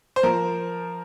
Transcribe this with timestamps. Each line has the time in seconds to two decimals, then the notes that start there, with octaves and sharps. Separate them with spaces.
0.16 C5
0.23 F3 A#4